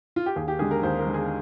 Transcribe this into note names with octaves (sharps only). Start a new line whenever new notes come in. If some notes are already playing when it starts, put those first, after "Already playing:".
F4
G4
D#2 G#4
G4
D3 G#3 G#4
A#4
D#2 C5
A#4
D3 G#3
G#4